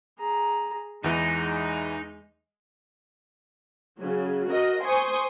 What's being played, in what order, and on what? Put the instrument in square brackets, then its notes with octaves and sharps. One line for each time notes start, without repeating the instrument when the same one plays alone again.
[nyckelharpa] G#4 A#5
[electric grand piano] E2 E3 [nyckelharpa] G#3 [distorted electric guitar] D#4
[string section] C#3 F#3
F#4 A#4 D#5
C5 G#5 C6 C#6 D#6